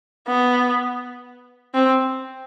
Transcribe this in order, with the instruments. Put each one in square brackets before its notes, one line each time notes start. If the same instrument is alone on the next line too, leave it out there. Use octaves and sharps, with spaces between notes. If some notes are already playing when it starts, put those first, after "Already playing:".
[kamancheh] B3
C4